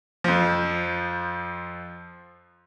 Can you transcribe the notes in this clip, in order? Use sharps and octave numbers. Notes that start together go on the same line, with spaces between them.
F2 F3